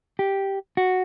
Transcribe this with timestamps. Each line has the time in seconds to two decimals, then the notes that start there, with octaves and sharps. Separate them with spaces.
0.19 G4
0.77 F#4